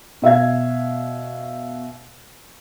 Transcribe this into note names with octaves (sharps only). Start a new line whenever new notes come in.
B2 E5 F5 G#6